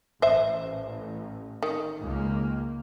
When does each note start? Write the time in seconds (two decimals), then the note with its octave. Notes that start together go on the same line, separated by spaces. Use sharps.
0.22 A1 C5 E5
1.63 D#3
2.03 C#2 A#3